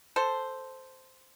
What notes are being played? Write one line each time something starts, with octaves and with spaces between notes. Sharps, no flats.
A4 C5